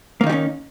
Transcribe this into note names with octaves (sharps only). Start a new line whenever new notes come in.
D#3 G3 A#3 C#4 D#4